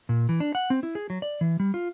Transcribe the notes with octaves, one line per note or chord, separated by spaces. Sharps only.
A#2
E3
D4
F#5
C4
E4
G#4
F#3
D5
E3
G3
F4